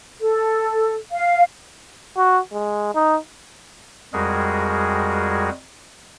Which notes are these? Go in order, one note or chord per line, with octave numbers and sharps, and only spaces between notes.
A4
F5
F#4
G#3
D#4
F2 G3 G#3 F#4 G#4 A#4